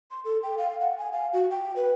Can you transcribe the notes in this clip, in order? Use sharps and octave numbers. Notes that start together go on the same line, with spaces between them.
C6
A4
G5
F5
F#5
G#5
F5
F#4
G5
B4